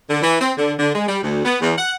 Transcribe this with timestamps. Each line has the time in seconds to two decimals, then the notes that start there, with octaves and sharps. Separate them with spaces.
0.10 D3
0.22 E3
0.41 C4
0.58 D3
0.79 D3
0.95 G#3
1.08 G3
1.22 D2
1.45 B3
1.61 E2
1.77 F#5